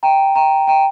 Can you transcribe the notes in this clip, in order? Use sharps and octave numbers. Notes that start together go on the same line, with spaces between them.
G5 A#5
G5 A#5
G5 A#5